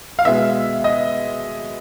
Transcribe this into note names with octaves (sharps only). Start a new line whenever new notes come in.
F5
B2 G#3 B3 E5
D#5